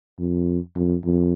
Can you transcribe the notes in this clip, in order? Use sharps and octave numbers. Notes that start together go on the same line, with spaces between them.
F2
F2
F2